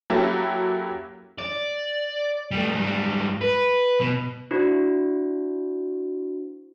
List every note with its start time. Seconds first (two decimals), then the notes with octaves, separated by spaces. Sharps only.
0.10 F#3 A#3 C#4 E4 G4 A4
1.39 D5
2.51 G3 A3
2.71 G#2 G3
3.41 B4
4.01 B2
4.51 D4 E4 F#4 C5